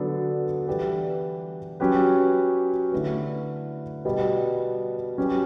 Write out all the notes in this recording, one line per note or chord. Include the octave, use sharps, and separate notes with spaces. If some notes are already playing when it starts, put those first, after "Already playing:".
Already playing: D3 F#3 B3 D4 A4
E3 G3 D4 G4 B4
F#3 C#4 G4 B4
D3 A3 E4 B4
B2 G3 B3
F#3 C#4 G4 B4